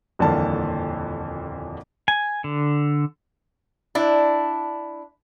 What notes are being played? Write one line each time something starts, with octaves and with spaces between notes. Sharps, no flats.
D#1 F2 D3 E3 A#3 A5
G#5
D3
D4 E4